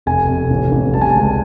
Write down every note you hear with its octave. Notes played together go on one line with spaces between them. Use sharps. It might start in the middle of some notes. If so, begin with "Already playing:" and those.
F1 G#5
F1
A1
A1
G3 A5
G#5
A5
C#2